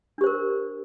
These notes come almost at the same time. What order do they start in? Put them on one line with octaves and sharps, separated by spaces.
D4 G4 C5 A#4